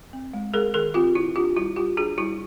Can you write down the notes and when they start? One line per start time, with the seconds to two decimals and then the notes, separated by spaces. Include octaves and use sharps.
0.13 C4
0.33 G#3
0.54 G#3 G#4 A#4
0.74 D#3 G#4 A#4
0.94 C4 F4 G4
1.15 D#3 E4 F#4
1.36 D4 F4 G4
1.56 G3 E4 F#4
1.76 G3 F4 G4
1.97 D4 F#4 G#4
2.18 G3 E4 F#4